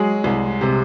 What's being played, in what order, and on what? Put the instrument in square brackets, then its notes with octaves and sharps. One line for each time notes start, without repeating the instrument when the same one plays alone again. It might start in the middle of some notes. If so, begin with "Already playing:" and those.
Already playing: [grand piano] F#3 G#3 G#4
C2
C3